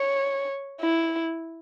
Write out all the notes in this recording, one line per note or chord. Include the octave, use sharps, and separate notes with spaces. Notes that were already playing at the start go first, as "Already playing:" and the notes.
Already playing: C#5
E4